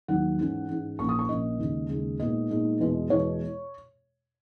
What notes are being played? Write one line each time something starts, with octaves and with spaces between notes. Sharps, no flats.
D#2 D#3 F#3 F#5
G#2 E3 G#3 C#4
G#2 E3 G#3 C#4
A#1 A#2 A#3 C#4 C#6
D#6
C#6
A#1 A#2 A#3 C#4 D#5
D#2 C#3 G#3
D#2 C#3 G#3
A#2 G#3 B3 D#4 D#5
A#2 G#3 B3 D#4
E2 B2 G#3 B3 E4
E2 B2 G#3 B3 E4 C#5